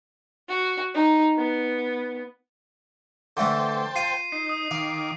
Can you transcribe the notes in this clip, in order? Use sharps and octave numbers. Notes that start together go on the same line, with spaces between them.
F#4
D#4
B3
D3 E3 A3 C5 G5 A5
F4 C7 D#7
D#4 C7
D#6
D#3 F5 D6